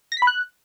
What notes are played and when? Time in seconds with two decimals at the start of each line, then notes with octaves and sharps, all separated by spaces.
0.12 A#6
0.17 B6
0.22 B5
0.27 F#6